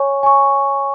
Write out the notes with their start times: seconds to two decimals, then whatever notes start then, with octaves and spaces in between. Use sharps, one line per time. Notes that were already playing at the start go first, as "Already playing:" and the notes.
Already playing: C#5 G#5 C#6
0.23 G#5 C#6